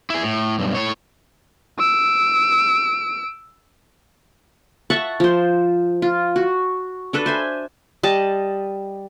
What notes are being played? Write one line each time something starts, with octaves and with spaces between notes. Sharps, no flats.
E4 G#4
A2
B1 G2
A2 C#5
E6 D7
E5 F#5 A5 C#6
F3 C5
F4
F#4
D4 A4 B4
C5 E5 G#5
G3 D#5 A5